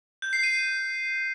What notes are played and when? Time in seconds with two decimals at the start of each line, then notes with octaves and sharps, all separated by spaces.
0.22 G6
0.33 C7
0.43 D#7